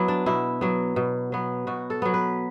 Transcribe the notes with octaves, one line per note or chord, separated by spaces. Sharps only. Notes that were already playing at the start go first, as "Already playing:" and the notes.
Already playing: F#3 B3 E4
D4
B2 E4
F#3 B3
B2
F#3 B3
B2 F#4
A4
F#3 B3
B4